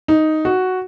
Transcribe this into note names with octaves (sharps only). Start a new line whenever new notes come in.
D#4
F#4